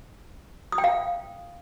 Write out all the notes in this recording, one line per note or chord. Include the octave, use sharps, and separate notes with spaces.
D#6
G5
F5